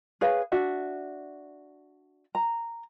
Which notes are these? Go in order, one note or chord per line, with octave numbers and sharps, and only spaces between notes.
G#4 B4 C#5 F5
D4 F#4 E5
A#5